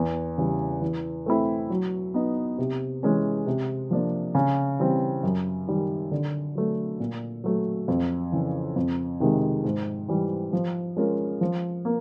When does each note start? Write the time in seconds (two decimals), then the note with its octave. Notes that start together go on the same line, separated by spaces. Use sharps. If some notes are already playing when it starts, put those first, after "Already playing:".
Already playing: E2
0.38 C#3 E3 G3
0.81 E3
1.26 A3 C4 E4
1.70 F#3
2.14 B3 D#4
2.58 C3
3.03 E3 G#3 C#4
3.46 C3
3.91 F3 A#3 D4
4.35 C#3
4.79 E3 G3 C4
5.23 F#2
5.67 D#3 G3
6.11 D3
6.55 F#3 A3
7.00 A#2
7.44 F#3 A3
7.88 F2
8.32 C#3 E3
8.76 F2
9.20 C3 D#3 G#3
9.64 G#2
10.08 E3 G3
10.53 F3
10.97 G#3 C#4 F4 A#4
11.41 F3
11.85 A#3